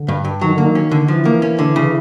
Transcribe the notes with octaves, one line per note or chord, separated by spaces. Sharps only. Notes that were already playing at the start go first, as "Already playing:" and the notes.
Already playing: D3
G2
G2
D#3 F#3
D3 A#3
D#3
C#4
D3
E3 F3
A#3
C#4
D3
C#3